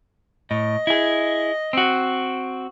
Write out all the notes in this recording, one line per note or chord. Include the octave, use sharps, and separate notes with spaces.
A2 D#5
E4 G#4
C4 F#4